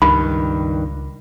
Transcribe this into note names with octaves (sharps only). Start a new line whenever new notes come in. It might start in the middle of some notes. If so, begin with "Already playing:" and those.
C#2 G2 D#3 B5